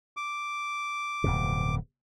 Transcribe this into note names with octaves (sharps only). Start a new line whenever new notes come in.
D6
D1 F2 B2